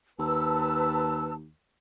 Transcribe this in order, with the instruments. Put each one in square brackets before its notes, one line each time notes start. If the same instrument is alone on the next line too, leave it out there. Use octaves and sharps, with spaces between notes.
[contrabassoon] D#2 [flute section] B4 A5 E6